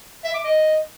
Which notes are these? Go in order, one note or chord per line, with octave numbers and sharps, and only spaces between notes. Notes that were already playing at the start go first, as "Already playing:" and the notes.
E5
D6
D#5